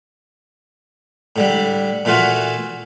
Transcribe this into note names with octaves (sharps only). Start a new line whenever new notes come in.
A2 D3 G3
A#2 E3 A3 F4 F#4